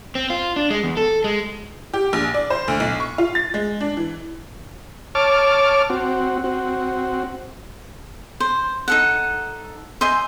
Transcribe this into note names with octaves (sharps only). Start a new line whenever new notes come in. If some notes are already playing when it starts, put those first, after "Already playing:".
C4
F4
D4
G#3
E2
A4
G#3
G4
A#1
D5
C5
D2
B1
C#6
F4
A6
G#3
D4
E3
C#5 A5 D6 F6
C4 F#4
C4 F#4
C5
D#4 A4 F#5
C5 D#5 E5 G#5